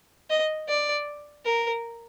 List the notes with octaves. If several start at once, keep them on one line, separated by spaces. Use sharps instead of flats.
D#5
D5
A#4